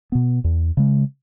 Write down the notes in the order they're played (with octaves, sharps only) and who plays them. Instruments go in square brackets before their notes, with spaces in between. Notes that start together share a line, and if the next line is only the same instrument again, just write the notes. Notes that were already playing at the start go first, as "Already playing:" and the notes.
[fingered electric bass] B2 B3
E2
C#3 G#3